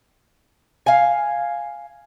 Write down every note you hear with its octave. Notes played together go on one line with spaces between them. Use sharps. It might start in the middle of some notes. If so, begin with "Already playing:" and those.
F5 G#5